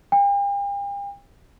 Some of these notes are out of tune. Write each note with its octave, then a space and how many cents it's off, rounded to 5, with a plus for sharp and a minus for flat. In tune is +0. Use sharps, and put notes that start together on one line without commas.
G5 +45